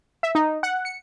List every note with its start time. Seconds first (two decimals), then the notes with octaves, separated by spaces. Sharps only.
0.23 E5
0.35 D#4
0.63 F#5
0.85 C#7